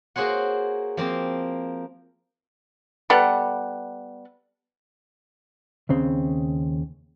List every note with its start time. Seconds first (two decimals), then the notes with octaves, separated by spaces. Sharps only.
0.16 A#3 F#4 G#4 C5 C#5 F#5
0.97 F3 A#3 C4
3.10 G3 B3 A4 F#5
5.89 D#2 C#3 C4